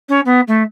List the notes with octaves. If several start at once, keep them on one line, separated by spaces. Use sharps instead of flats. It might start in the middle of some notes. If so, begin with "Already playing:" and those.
C#4
B3
A3